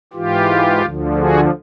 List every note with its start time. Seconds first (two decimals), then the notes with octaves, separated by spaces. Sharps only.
0.13 G#2 E3 F4 G4
0.82 D2 D3 F3
1.16 F#4 G#4